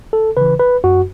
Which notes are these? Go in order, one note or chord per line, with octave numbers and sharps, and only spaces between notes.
A4
C#3 E3 B4
B4
F#2 F#4